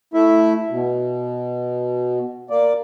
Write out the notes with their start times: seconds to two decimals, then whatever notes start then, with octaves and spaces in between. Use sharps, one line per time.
0.14 A3 E4 E5
0.71 B2
2.50 A#3 D5